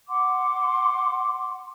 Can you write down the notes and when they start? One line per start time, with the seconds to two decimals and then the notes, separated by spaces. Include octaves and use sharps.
0.09 F#5 C6 D6